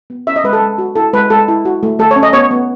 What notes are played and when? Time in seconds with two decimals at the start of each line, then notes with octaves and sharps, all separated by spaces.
0.10 B3
0.27 C#4 E5
0.36 D#5
0.44 G#3 B4
0.53 A4
0.62 G#3
0.78 F#4
0.96 E4 A4
1.13 G#3 B4
1.30 G#3 A4
1.48 E4
1.65 F#4
1.83 A3
1.99 A3 A4
2.11 C#5
2.16 C#4
2.23 D#5
2.33 B3 C#5
2.51 B3